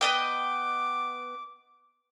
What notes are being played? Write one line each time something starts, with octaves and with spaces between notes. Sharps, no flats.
B3 D#5 G5 D6